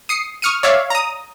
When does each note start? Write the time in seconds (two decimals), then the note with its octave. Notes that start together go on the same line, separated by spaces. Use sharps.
0.09 D#6 C7 C#7
0.42 C#6 D#6 F6 C#7 D#7
0.63 C#5 D5 E5 F5
0.90 A#5 D#6